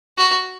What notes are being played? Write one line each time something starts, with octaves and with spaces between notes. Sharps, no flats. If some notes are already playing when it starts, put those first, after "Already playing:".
F#4